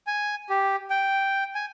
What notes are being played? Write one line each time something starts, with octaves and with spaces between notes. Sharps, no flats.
G#5
G4
G5
G#5